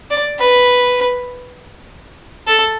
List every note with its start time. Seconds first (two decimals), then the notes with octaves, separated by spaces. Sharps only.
0.10 D5
0.40 B4
2.47 A4